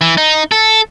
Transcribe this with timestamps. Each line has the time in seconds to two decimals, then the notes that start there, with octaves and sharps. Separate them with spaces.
0.01 E3
0.17 D#4
0.52 A4